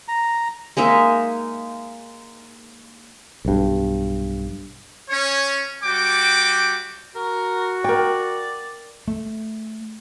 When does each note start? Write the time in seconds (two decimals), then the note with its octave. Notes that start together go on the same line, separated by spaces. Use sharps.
0.08 A#5
0.77 G#3 A#3 D#4 E5
3.45 B1 G2
5.10 C#4 C#5
5.84 G3 F#4 G5 D6
7.16 F#4 A#4
7.84 A#4 D5 G5
9.08 A3